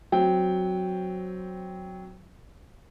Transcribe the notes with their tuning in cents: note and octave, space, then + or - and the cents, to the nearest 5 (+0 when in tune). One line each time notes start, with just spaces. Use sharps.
F#3 +0 C4 +0 G5 +0